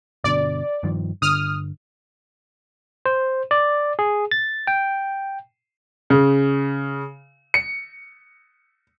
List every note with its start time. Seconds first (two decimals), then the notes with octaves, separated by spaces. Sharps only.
0.24 G1 B2 D3 D5
0.83 G2 D#3 F3
1.22 G1 D3 D#6 F6
3.06 C5
3.51 D5
3.99 G#4
4.31 A6
4.67 G5
6.10 C#3
7.54 C#7